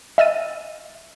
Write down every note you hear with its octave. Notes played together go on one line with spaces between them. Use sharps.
D#5 E5 E6 F6 A6 D#7